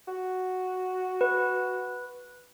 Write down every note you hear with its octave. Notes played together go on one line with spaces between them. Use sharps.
F#4
B4